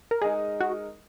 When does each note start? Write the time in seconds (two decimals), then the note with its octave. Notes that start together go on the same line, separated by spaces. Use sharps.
0.11 A#4
0.22 G#3 D#4 G#4 A#4 D#5
0.61 F#4